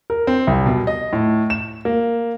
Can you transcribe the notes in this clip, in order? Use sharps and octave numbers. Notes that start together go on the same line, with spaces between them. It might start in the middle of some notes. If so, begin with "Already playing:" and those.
A#4
C4
C2
B2
D#5
A2
E7
A#3